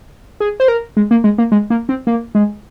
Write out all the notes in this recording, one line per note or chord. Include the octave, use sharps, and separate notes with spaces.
G#4
C5
A#4
G#3
A#3
G#3
A#3
G#3
A#3
C4
A#3
G#3